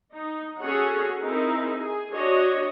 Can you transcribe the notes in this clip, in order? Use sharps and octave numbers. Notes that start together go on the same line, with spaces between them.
D#4
C#4 F#4 G#4 A4 C#5 F#5
C4 D#4 E4 G#4 A#4
G#4
D4 F#4 C#5 D#5